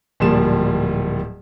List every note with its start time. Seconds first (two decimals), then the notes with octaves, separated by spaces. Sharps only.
0.20 D1 A#2 F3 G3 A#3 E7